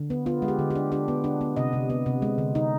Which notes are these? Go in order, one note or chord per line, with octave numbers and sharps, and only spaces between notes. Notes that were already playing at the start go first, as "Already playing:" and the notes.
Already playing: D3
B3
B3 F4
G#3
G4
D3
D4 G4
D4 G4
B3
D4
B3
C3 D#5
C3
B3
C3
G#3
D3
D#4